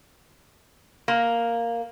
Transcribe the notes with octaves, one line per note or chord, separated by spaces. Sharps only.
A#3